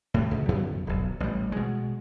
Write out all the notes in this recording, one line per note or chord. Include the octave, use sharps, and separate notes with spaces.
A2 C3 A3
C#2
F#2 D3 B3
D#1 B1
A1 G3
B2 G#3